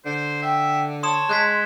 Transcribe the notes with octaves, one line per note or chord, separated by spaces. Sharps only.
D3 C5
E5 G5
C#5 A5 C6 D#6 E7
G#3 F#6 G#6 B6